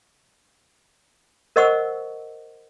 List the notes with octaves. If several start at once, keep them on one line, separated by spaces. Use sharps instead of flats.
A#4 C5 D#5 F#5 C#6 E6